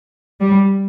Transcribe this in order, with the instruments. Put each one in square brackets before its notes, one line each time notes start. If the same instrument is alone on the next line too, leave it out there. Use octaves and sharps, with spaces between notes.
[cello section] G3